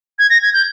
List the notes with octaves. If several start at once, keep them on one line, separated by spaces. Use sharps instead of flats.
G#6
A#6
G#6
G6